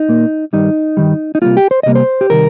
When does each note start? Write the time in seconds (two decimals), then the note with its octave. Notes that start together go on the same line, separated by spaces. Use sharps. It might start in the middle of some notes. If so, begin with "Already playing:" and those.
Already playing: D#4
0.09 A#2 A#3
0.53 G2 D#3 G3 D#4
0.97 G2 D#3 G3
1.35 D#4
1.42 C3 G3 A#3 F4
1.57 G4
1.71 C5
1.83 C3 G3 A#3 D#5
1.95 C5
2.21 G4
2.30 C3 D#3 G3 A#4